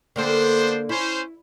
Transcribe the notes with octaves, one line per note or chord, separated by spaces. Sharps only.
D3 A#3 B3 D4 A4 C5
C#4 E4 C5